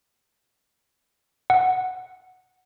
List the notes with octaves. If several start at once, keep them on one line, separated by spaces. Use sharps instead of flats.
F#5